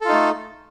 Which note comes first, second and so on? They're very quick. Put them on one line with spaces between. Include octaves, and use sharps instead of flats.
A4 F4 D#4 A3